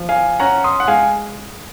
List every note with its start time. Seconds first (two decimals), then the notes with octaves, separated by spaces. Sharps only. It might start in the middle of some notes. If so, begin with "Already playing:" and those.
Already playing: F3
0.09 F5 G#5
0.39 C#4 F#5 A#5
0.64 C6 D#6
0.80 F#5
0.88 G#3 F5 G#5